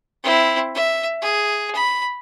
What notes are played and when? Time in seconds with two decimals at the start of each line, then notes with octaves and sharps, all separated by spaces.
0.24 C4 E4
0.75 E5
1.22 G#4
1.75 B5